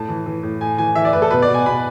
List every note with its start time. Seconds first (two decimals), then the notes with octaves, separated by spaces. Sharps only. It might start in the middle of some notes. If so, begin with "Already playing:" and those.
Already playing: A2 A5
0.09 E3
0.26 E3
0.43 A2
0.61 A2 G#5
0.78 E3 G#5
0.95 E3 E5
1.05 D5
1.13 A2 B4
1.22 A4
1.31 B2 B4
1.42 D5
1.48 B2
1.54 G#5
1.66 B2 B5